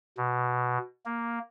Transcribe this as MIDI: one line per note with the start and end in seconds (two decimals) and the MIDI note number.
0.17 0.78 47
1.06 1.39 58